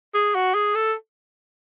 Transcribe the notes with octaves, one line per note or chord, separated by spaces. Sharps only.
G#4
F#4
G#4
A4